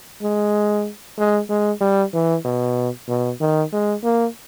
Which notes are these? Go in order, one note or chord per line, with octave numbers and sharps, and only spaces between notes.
G#3
G#3
G#3
G3
E3
B2
B2
D#3
G#3
A#3